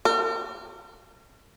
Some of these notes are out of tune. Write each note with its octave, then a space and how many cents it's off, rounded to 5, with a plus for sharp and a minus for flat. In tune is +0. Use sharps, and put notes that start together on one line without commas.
A#4 -45